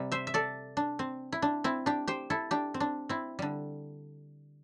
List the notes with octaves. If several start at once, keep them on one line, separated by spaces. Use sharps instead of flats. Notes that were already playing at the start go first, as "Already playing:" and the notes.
Already playing: C3 G3
C5 E5
E5
A4 D5
D4
C4
E4
D4
C4 E4
D4 G4
G4 C5
E4 A4
D4 G4
C4
D4
C4 E4
D3 G3